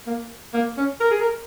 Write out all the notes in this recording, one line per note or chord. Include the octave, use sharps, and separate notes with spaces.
A#3
A#3
C#4
A#4
G#4
A#4